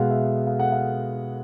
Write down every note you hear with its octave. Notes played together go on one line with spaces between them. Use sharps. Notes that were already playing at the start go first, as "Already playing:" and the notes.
Already playing: B2 G#3 F5 F#5
E5
F5
F#5
F5